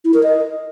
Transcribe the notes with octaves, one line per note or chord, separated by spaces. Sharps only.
E4
A#4
D#5